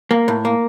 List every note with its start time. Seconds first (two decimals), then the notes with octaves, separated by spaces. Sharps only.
0.11 A#3
0.28 A2
0.45 A#3